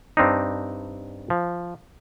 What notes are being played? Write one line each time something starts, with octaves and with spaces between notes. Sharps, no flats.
G2 C4 D4 D#4
F3